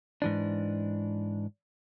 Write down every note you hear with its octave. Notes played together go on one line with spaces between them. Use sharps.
G#2 E3 D4